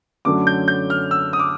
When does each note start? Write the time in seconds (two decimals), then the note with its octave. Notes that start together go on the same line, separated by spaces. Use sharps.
0.25 F#2 D3 F#3 A3 C#4 D6
0.47 G6
0.68 G6
0.90 F6
1.11 E6
1.33 D#6
1.39 D6